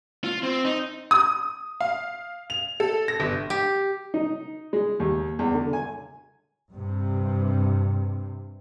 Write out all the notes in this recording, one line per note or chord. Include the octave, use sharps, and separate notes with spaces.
F4
C4
D#4
D#6
F5
F7
A4
A#6
G1
G4
D#4
G#3
D#2
E2
D3
G#5
G2 C3